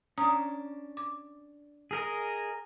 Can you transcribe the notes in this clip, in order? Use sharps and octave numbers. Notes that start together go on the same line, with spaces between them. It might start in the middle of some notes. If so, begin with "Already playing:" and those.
C#4 D4 A#5 D#6
D6
G#4 A#4 D#5